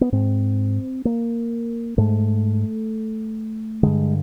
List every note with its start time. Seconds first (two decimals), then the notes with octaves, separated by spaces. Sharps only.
0.01 B3
0.12 G#2 C4
1.05 A#3
1.98 G#2 A3
3.83 G2 D3 G#3